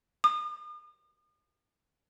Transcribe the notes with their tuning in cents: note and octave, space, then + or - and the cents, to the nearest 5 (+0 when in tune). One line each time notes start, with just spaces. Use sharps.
D#6 -45